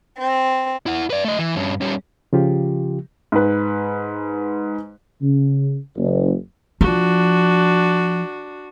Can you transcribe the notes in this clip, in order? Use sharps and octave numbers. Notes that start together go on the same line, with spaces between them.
C4
E4 F#5
B4 D5
A3 D#5
E3
G2 C#4
G3 C#4
C#3 F3 F4 G4
G#2 B4
C#3
F#1
F3 D4 F#4